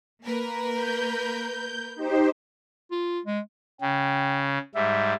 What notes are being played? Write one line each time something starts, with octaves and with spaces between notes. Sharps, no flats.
A#3 A#4 B4
G6
D#4 G4 C5
F4
G#3
C#3 G5
G#2 G3 E5